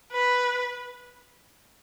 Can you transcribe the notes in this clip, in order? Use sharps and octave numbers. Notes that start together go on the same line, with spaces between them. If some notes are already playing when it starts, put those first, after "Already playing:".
B4